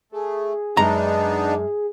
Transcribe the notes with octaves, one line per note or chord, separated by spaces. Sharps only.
A3 G#4
F#2 G#3 B3 D4 D#4 A#5